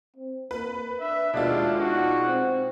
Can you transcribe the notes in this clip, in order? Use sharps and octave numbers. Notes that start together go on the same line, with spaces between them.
C4
A#3 B4
D4 E5
D#2 B2 G#3 D4 F4
D#4 F#4
C4